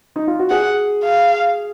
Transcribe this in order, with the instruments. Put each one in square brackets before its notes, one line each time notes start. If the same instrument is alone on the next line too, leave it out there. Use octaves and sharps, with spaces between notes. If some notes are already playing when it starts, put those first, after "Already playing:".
[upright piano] D#4
F4
F#4
[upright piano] G#4 [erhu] F#5
[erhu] F5